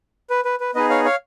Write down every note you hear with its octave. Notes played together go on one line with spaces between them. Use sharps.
B4
B4
B4
B3 D#4 G#4 B4 D#5
C#5 F5
C#5 F5